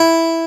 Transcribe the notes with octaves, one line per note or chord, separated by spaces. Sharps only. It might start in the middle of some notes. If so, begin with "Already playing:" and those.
Already playing: E4